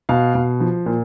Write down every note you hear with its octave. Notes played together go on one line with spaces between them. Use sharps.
B2 F5
B2
F3
A#2